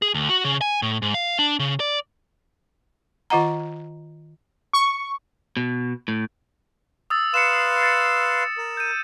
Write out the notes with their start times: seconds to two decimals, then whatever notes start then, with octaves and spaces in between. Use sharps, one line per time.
0.02 G#4
0.14 D2
0.29 F#4
0.45 C#3
0.61 G#5
0.82 A2
1.02 G#2
1.14 F5
1.39 D4
1.59 C#3
1.80 D5
3.30 D#3 F4 D#5 F#5 A#5
4.73 C#6
5.57 B2
6.08 A2
7.10 D#6 E6 A6
7.34 B4 F5 C6 C#7 E7
7.83 A6 C#7
8.57 A#4
8.77 G6 D#7